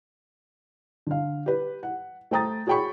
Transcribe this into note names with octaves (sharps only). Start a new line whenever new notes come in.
D3 F5
G4 B4
F#5
A3 C5 G5 A#5 D#6 A6
F#4 G#4 C#5 G5 B5 C#6